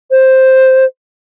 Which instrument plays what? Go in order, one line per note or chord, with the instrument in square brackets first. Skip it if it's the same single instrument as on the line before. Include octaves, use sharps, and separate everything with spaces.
[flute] C5